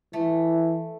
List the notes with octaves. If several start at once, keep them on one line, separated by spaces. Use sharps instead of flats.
E3 A3